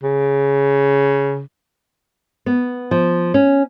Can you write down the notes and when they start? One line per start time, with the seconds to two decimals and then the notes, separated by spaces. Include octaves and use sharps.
0.03 C#3
2.46 B3
2.91 F3
3.34 C#4